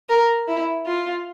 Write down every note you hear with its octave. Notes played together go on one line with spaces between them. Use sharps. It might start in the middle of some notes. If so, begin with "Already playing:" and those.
A#4
E4
F4